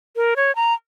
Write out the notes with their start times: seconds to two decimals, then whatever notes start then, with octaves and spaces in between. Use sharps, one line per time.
0.16 A#4
0.36 C#5
0.56 A#5